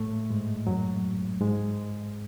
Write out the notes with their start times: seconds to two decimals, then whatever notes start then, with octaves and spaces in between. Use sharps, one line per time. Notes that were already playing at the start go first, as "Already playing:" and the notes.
Already playing: A2 A3
0.30 G#2 G#3
0.67 F#2 F#3
1.41 G#2 G#3